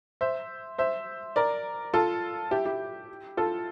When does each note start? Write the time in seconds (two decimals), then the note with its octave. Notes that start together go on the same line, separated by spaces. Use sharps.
0.21 C5 E5
0.78 C5 E5
1.36 A#4 D5
1.94 F4 A4
2.51 E4 G4
2.66 E4 G4
3.37 F4 A4